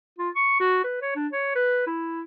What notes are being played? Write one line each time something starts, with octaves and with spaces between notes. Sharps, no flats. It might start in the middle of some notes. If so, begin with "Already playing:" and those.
F4
C#6
F#4
B4
C#5
D4
C#5
B4
E4